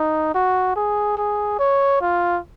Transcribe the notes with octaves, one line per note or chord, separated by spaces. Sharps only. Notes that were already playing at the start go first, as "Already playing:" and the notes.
Already playing: D#4
F#4
G#4
G#4
C#5
F4